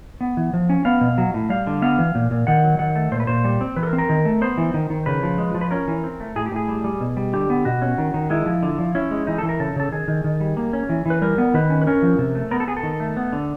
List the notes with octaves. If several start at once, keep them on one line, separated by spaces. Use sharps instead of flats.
B3
E3
F3
C#4
B3 F5
B2
F#3
A2
G3 F5
D3
B3 F5
E3
A#2
A#2
D#3 F#5
F#3
D#3 F#5
A3
A#2 C5
B4
A#2 C5
G3
C4
E3 B4
A4
A#4
C4
A#4
D#3
A3
B3 C5
E3
D#3
D#3
C#3 B4
F3
G#3
F3
B4
C#4 A#4
E3
C4
A3
A2 G#4
G4
A2 G#4
G3
G3
B2
G3
D3 G4
B3
B2 F#4
C#4
D#3
D#3
G#3 E4
F3
D3
F3
C#4 E4
G#3
E3 D#4
E3 A4
A#4
C#3 A4
C#3 A4
D#3 G#4
D#3
D#3
G3
A#3
C#4
E3
E3 B4
G3 A#4
B3
D#3 B4
C#4
B4
C#4 A#4
F3
C3
A3
B3 A#4
A4
B3 G#4
A4
D#3
A3
B3
D3